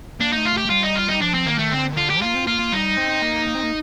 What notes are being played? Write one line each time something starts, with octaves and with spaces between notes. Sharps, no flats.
A#3 D4
A3 D#4
F4
A3
G4
A3
G3 F4
D#4
F4
G3 D#4
F3 D4
C4
D#3 A#3
A3
D3 C4
D#3
D3 F4
G4
A#3 F4
C4
A#3 F4
A#3
G3 D#4
C4
A#3
A#3
C4
A#3